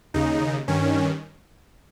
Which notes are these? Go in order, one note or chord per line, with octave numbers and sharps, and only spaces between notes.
D#2 C#3 D#4
G2 D#3 C#4